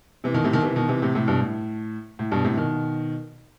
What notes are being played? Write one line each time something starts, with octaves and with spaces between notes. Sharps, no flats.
C3 E3
B2 D#3
A2 C3
B2 D#3
C3 E3
B2 D#3
C3 E3
A2 C3
A2 C3
G2 B2
A2
A2
G2 B2
A2 C3
B2 D#3